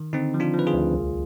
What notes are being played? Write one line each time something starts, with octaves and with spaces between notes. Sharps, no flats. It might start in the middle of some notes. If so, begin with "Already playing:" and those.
Already playing: D#3
D3 C4 D#4
F3
D4 F4
F3
B4
F4 G#4
D2
C2